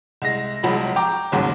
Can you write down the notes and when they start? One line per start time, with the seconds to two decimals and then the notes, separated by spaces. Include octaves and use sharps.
0.22 C2 G#3 A#6
0.63 E1 C2 F3 F#3 G#3 B5
0.96 G5 A#5 D6
1.32 F#1 D#2 G#2 C#3 F#3